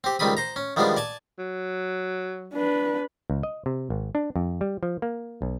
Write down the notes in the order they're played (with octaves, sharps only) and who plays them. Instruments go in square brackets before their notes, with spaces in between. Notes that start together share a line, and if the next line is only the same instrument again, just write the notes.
[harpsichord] C4 G4
C#2 D#3 G3 C4 B5 D#6
C5 A#5
C#4
D#3 F3 G3 G#3 B3 D4
D5 G#5 A5
[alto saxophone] F#3
[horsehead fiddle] D4 B4
[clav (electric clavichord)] C#2
D#5
C3
G#1
D4
F2
G3
F3
A#3
B1